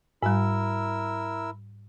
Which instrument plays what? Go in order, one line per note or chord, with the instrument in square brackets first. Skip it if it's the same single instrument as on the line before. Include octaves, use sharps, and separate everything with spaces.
[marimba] G#2 G3 [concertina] E4 A#4 E6